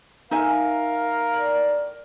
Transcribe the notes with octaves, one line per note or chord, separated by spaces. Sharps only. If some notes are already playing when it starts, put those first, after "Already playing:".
D#4 A#4 E5 F5 G#5
A2 D5